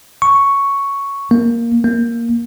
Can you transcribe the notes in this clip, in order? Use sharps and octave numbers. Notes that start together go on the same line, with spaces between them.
C#6
A#3
A#3